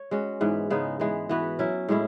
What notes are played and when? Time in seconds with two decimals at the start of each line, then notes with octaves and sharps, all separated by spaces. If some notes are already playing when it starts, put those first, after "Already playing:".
Already playing: C#5
0.11 G#3 C#4 F#4
0.41 G#2 E3 B3
0.70 C#3 G#3 B3 D#4
1.00 E3 G#3 B3
1.29 E3 B3 F#4 B4
1.59 F#3 C#4 E4
1.89 A2 G#3 C#4 E4